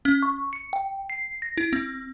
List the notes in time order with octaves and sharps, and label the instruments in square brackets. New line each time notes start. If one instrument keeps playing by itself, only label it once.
[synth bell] C#4
C#6
C#7
G5
C7
A#6
E4
C4